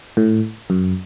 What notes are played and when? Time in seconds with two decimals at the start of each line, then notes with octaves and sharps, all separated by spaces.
0.17 A2
0.70 F#2